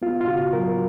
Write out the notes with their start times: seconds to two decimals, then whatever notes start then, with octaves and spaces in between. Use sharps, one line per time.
0.02 B3 F4
0.21 F4
0.27 C#3 F#4
0.53 F#3 A#4